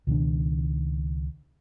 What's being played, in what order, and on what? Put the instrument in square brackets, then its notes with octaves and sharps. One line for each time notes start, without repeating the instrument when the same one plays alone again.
[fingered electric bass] C#2 B2 D#3 D4